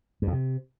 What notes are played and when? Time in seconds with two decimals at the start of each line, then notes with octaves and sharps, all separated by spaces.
0.22 G2
0.27 F2
0.33 C3